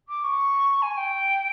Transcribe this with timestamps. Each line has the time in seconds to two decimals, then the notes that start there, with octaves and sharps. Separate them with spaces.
0.08 D6
0.23 C#6
0.82 G#5
0.97 G5